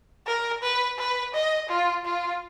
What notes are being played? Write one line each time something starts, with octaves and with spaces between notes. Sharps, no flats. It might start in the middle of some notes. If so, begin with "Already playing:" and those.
A#4
B4
B4
D#5
F4
F4